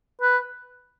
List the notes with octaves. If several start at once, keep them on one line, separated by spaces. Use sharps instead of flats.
B4